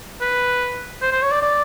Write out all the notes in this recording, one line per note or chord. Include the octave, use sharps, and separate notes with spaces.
B4
C5
C5
C#5
D5
D5